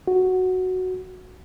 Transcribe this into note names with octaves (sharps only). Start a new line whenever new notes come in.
F#4